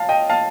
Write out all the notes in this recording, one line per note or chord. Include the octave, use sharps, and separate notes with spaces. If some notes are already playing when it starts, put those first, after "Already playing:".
Already playing: F5 A5
D#5 G5
F5 A5